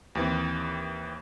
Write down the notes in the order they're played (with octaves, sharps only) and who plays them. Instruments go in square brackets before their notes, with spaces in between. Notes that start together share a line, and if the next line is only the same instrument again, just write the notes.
[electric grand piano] D#2 E3 C4